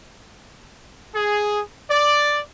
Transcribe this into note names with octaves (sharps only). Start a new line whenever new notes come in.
G#4
D5